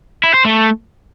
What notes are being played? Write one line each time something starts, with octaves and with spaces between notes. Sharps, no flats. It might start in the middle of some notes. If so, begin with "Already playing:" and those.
E4
C5
A3